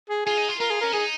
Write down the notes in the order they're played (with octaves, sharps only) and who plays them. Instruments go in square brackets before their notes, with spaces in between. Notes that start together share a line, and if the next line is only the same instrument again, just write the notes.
[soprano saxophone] G#4
[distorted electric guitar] F4 [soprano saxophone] G#4
[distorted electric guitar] D#4
F4
[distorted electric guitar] F4 [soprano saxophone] A#4
[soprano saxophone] G#4
[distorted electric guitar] C#4 [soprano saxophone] A#4
[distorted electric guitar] D#4 [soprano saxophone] G#4